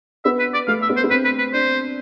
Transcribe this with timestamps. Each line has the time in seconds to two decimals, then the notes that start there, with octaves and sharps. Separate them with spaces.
0.25 B3 E5
0.39 B4
0.54 D5
0.67 A3 F5
0.82 E5
0.89 B3
0.96 C5
1.04 B3
1.10 C4 B4
1.25 B4
1.38 B4
1.53 D4 C5